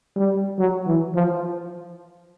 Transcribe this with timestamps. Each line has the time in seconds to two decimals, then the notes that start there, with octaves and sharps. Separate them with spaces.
0.17 G3
0.58 F#3
0.87 E3
1.15 F3